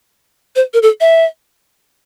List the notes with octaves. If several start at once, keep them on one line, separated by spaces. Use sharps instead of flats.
C5
A#4
A4
E5